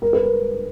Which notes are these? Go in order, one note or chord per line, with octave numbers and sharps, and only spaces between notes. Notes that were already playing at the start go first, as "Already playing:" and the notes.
A#4
B4
A#4